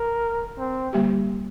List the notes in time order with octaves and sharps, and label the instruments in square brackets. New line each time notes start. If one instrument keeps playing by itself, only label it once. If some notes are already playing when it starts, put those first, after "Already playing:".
Already playing: [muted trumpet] A#4
C4
[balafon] D3 G3 A#3 G4